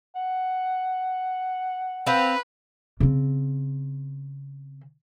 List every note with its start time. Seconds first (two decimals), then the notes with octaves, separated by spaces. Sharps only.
0.15 F#5
2.06 C4 B4 F5
3.00 C#3 C4